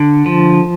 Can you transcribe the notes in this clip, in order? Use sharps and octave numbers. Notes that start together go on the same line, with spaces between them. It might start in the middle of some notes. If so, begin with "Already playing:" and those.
Already playing: D3
F3